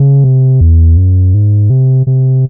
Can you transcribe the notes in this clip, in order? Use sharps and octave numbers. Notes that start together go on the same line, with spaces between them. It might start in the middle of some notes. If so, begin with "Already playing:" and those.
Already playing: C#3
C3
E2
F#2
G#2
C3
C3